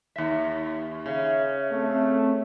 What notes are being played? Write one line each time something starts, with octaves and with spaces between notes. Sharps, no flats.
D#2 E5
C#3 E5
A3 C4